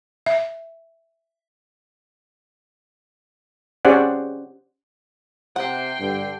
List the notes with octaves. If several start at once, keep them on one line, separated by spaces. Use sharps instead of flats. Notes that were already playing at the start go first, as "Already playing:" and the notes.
E5
C#4 G4 G#4 C5 D5 F#5
C3 F#5 G5 C7
G2 D3